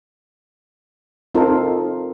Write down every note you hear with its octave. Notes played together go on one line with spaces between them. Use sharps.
C4 D#4 F4 A4 A#4